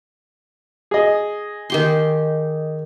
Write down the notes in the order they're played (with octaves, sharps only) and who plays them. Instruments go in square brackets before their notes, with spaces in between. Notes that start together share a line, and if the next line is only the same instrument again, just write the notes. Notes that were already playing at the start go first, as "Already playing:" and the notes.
[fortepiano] G#4 D#5
[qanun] D#3 G4 C6